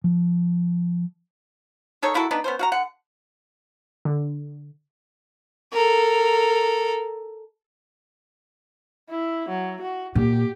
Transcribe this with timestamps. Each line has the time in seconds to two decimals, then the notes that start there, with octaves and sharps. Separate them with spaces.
0.04 F3
2.02 D#3 D#4 A4 C#5
2.14 A#3 E4 F#4 A4
2.31 B3 D4 D#4 B4
2.44 B3 C#4 C5
2.59 F#4 F5 A#5
2.72 D3 F#5
4.05 D3
5.73 A4 A#4
9.10 E4
9.49 F#3
9.81 F#4
10.15 A#2 G4